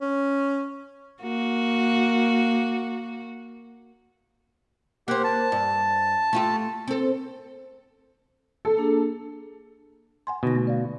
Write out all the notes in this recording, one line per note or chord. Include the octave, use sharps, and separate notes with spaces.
C#4
A#3 F#4
A#3 G4 C5 F#5
A5
G2
A3 F4 G4
C4 A4
A4
A#3 D4 G#4
F#5 G#5 C6
B2 D3 D#4 A#6
A3
D5 F5